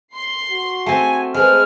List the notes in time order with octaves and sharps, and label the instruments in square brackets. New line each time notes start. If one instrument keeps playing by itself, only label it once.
[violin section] C6 C7
[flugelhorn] F#4
[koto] A3 C4 [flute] G#5
[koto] G#3 [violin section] A3 G#4 B4 [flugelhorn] C5 [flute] F6